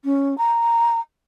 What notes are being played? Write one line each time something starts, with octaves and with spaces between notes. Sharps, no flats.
C#4
A#5